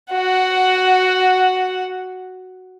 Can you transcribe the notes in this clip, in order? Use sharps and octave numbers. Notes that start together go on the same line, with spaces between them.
F#4 F#5